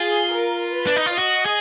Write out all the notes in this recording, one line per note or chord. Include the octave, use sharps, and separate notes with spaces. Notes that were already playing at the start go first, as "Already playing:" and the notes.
Already playing: F4 G#4
A#4
B4
D4
D#4
F4
F#4 D#5
G#4